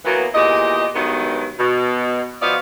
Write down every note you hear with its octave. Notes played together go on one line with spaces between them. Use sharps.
E3 F#3 A#3 B3
E2 A#2 G4 D#5
G2 D#3 F#3 G#3 B3
B2
F3 B3 F#4 D5 D#5 F5